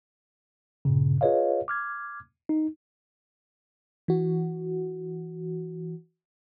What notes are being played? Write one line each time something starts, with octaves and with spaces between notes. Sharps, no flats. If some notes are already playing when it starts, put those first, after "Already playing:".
G2 A#2 C#3
F4 G#4 B4 C#5 D#5 F5
D6 F6 G#6
D#4
E3 F#4